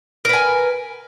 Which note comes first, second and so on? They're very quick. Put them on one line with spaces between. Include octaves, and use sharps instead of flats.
A#4 B4 G#5